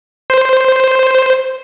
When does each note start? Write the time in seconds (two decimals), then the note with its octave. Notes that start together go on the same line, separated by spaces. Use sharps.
0.30 C5